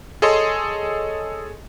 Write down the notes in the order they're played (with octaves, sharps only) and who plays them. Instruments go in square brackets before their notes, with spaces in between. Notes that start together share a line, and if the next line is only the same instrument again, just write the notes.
[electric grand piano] G#4 A4 C#5 D#5 A5 C6